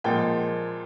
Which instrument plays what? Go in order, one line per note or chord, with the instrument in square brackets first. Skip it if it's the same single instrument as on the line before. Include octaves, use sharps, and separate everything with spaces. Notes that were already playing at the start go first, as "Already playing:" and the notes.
[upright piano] A#2 F3 G#3 G5